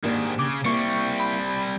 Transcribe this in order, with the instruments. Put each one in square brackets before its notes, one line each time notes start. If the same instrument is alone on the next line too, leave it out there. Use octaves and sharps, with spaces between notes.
[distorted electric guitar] G#2 D#3 [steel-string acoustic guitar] A#3 D4 G4
[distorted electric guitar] C#3 [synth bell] D6
[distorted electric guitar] G3 C4 [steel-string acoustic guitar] A#3 E4 [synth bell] C#6 C#7
[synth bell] B5